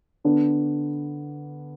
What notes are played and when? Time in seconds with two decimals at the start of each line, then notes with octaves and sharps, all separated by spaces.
0.24 D3 B3 D4